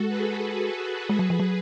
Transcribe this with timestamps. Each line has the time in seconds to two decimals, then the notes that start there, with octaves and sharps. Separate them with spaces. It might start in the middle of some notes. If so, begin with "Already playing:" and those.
Already playing: G#3 F#4 A4
0.09 G#4 B4
1.09 G#3 G#4 B4
1.19 F#3
1.30 F3
1.40 F#3